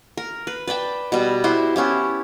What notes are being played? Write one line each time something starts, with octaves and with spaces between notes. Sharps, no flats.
A#4
B4
B4 D5 G5 A5
B2 G3
E4 F#4 G4 C5
B3 C#4 E4 G4